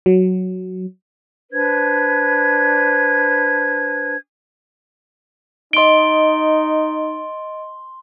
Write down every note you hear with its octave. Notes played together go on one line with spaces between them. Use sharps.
F#3
D4 B4 C5 G#6
D#4 D#5 C6 D7 G7